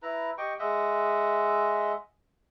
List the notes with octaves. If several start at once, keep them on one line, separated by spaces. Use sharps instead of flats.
E4 B4 A#5
G4 D#5 G5 C#6
G#3 D#5 E5 F#5